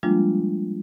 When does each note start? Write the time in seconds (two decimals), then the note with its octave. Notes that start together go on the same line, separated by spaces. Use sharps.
0.03 F3 G3 G#3 A#3 D4 F4